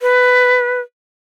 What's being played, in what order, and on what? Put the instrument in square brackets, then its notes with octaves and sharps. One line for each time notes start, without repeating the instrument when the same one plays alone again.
[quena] B4